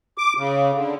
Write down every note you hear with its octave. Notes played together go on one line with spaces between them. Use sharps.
D6
C#3
D3